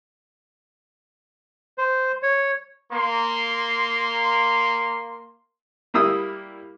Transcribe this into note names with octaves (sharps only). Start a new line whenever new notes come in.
C5
C#5
A#3 C6
G3 A#3 E4 D#6 E6